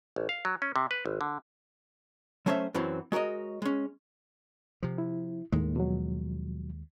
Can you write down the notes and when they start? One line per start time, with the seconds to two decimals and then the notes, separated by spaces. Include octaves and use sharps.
0.16 A1
0.29 F5
0.45 F#3
0.62 C#4
0.76 C3
0.91 B4
1.06 G#1
1.21 D3
2.46 F#3 A3 C#4 C5 C#5 E5
2.74 F#2 E3 F#3 C4
3.12 G#3 F#4 A#4 C#5 D#5
3.62 G#3 C#4
4.83 C3 F3
4.98 E4
5.52 D#2 A2 D#3 G#3 A#3
5.76 B2 F3 F#3